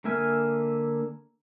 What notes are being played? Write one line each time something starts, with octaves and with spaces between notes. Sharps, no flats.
D3 A#3 E5 G#5 F6